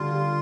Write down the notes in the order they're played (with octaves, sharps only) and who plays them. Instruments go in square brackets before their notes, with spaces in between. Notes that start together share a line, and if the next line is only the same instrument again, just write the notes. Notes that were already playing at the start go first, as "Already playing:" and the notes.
Already playing: [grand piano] D3 G3 [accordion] F4
[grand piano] G3